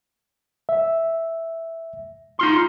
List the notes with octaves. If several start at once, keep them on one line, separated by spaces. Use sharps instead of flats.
E5
D#4 F4 C6